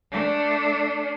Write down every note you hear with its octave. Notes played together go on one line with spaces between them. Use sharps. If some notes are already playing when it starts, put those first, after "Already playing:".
A3 D4